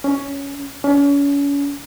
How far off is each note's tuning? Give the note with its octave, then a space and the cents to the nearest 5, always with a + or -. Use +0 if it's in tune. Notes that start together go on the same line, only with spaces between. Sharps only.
C#4 +10
C#4 +35